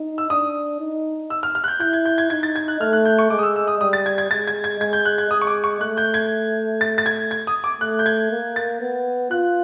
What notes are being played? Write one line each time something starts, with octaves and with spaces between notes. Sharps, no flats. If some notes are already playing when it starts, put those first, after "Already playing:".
Already playing: D#4
E6
D4 D#6
D#4
E6
F6
F6
F#6
G6
E4 G6
G#6
G6
G#6
D#4 G#6
A6
G#6
F#6
A3 F6
F#6
G6
C#6
G#3 D6
D#6
E6
E6
D#6
G3 D#6
A6
G#6
G#6
G#3 A6
G#6
G#6
G#3 G#6
G6
F#6
G#6
G#3 D#6
C#6
D6
C#6
A3 F#6
G6
G#6
A6
A6
G#6
G#6
D#6
D6
A3 F#6
G6
G#6
A#3
A6
B3
F4 F#6